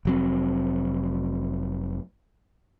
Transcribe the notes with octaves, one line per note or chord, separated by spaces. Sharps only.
F1 F#3 C4